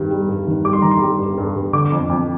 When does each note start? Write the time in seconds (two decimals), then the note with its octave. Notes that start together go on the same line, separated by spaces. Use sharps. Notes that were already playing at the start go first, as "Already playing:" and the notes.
Already playing: G2 D#3 G3
0.11 G3
0.29 G2
0.47 D#3
0.64 G3 D6
0.73 C6
0.82 D#3 A#5
0.91 C6
1.00 G3
1.19 G2
1.38 G2
1.56 G2
1.73 D3 D6
1.92 F2
2.10 F2